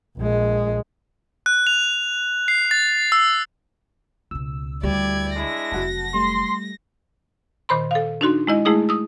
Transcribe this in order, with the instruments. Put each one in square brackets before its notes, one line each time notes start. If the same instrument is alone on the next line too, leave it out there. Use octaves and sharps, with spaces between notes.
[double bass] A#1 G#3
[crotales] F#6
F7
C7
A6
E6
[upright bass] C#2 B2 [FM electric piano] E6
[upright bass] D2 [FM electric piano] G3 [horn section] E4 G4 [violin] D5 G#6
[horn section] G#3 D4 E4 [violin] A#6
[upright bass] F1 F#3 [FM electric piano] F#4 F#5 A5
[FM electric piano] G3 A3 [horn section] C6
[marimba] A#2 D#3 C5 B5 C6
A4 F5
D4 D#4 F#4 C6
G#3 E4 D#5
G#3 A3 E4 G#4 D#6
D#6 E6